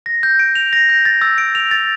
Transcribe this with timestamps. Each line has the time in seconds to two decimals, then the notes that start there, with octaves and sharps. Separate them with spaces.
0.06 A#6
0.23 G6
0.39 D7
0.55 F7
0.73 A#6
0.89 G6
1.05 A6
1.22 E6
1.38 D7
1.55 F7
1.71 A6